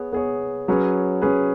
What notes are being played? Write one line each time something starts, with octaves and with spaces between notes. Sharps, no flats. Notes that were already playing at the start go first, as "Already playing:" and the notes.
Already playing: B3 G#4 C#5
B3 G#4 C#5
F#3 C#4 G#4 B4
F#3 C#4 G#4 B4